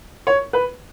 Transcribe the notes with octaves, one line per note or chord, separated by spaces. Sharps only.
C#5
B4